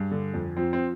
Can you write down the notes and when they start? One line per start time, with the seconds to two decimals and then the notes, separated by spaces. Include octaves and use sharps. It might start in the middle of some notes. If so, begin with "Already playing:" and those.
Already playing: G2 G#4
0.11 D3
0.34 F2
0.57 F3 C4
0.73 C4